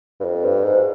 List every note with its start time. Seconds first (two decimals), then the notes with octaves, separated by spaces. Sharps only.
0.20 G2
0.24 F2
0.44 G2
0.64 G#2